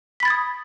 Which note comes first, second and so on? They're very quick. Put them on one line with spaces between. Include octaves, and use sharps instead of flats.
B6 B5 A6 G#6 D#6